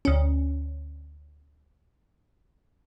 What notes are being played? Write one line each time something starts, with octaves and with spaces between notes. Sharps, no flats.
D2 C#4